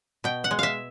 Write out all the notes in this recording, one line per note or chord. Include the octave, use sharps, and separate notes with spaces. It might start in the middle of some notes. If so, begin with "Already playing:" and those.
B2 G5
F#5
G#3
E5 F5